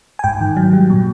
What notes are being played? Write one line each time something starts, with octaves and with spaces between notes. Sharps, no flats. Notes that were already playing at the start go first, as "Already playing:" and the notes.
G#5
G#2 G5
D#3
F#3
G3
A#2